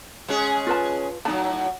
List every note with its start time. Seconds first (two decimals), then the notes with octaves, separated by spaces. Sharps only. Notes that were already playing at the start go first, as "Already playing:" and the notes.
0.28 G#3 C#4 G#4
0.67 F4 B4 A5
1.25 A2 F#3 D#4 A5